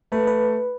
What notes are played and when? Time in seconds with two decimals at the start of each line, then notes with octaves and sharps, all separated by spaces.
0.12 A3 B4
0.27 B4